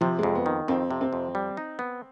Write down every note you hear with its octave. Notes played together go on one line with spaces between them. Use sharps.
C3 F3
F2 G#3
B3
D#3
F2 C4
C3
C4
F2
G3
D#4
B3